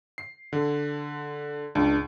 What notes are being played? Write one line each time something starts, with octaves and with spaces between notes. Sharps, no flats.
C7
D3
C#2 D4